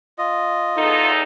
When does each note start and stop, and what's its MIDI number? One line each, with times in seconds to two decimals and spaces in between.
0.18 1.11 65
0.18 1.11 75
0.77 1.23 40
0.77 1.23 63
0.77 1.23 69